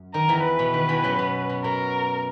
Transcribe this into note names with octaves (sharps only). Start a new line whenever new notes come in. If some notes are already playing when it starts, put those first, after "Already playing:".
Already playing: F#2
D#3 A#4
E2 E3
B4
B2
D#3
E2 E3
F#2 F#3
B2
B2
B2 A#4